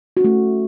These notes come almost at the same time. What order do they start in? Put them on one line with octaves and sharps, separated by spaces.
F#4 C#4 A3